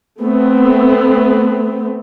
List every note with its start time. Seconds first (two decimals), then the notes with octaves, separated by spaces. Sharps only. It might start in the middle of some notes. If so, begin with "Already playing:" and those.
0.20 A3 B3 C4